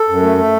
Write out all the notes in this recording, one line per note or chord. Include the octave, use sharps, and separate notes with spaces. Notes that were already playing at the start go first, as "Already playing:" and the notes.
Already playing: A4
F#2
A3
A3